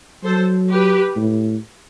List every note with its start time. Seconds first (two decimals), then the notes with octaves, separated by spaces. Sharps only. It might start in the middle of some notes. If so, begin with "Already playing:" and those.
0.24 F#3 A4 C5
0.70 G4 B4
1.16 A2